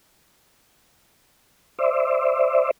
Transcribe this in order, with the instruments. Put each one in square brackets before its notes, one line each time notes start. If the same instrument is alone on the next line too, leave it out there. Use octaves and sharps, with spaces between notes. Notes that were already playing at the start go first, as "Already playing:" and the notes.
[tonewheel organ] C5 D5 E5